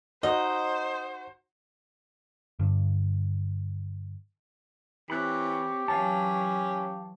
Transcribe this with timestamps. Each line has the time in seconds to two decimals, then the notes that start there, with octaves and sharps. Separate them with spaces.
0.23 D#4 F#4 C5 D#5
2.59 G2 D3
5.10 E3 C4 G4 C#5 B5 F#6
5.88 E3 F#3 C#4 F5 A5